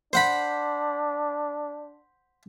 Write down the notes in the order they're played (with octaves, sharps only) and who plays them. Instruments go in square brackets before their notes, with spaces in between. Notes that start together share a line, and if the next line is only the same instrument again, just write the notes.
[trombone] D4 [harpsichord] C5 F#5 B5